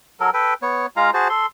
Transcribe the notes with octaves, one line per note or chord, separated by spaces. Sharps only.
F#3 A4 A#4
A4 B4 G5
B3 C#5
G#3 F4 F5 A#5
F#4 G#4 C5 A5
A4 C6